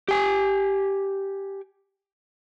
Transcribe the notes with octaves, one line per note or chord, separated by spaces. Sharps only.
G4 G#5